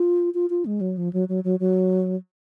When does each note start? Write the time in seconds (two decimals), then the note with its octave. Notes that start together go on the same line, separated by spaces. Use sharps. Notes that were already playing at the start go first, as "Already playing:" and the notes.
Already playing: F4
0.34 F4
0.50 F4
0.66 G#3
0.81 F#3
0.97 F3
1.13 F#3
1.29 F#3
1.44 F#3
1.60 F#3